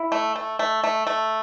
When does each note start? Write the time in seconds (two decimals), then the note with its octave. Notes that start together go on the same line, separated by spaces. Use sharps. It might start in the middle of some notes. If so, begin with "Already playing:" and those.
Already playing: E4
0.12 A3
0.36 A3
0.59 A3
0.84 A3
1.07 A3